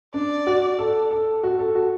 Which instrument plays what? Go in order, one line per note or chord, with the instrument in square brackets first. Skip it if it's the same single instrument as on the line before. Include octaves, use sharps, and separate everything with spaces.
[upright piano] D4 [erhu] D5
[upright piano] F#4
A4
A4
F#4
A4
F#4